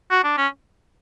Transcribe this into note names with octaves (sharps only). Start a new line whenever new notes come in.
F#4
D4
C#4